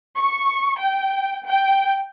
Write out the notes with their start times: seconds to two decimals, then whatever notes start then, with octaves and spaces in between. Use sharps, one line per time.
0.17 C#6
0.80 G5
1.47 G5